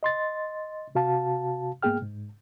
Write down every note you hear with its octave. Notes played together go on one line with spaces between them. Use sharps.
D#5 C6 A6
C3 F#4 F5 A5
G#2 A#3 B3 G#4 G5 F6
G#2